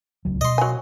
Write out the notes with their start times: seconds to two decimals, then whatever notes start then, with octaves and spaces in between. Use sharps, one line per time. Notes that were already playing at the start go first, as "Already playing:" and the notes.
0.25 D1 C#2 F#3
0.41 B2 D#5 C6
0.58 F#3 G#5